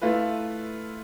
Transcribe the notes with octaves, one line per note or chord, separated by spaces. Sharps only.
A3 E4 F4 B4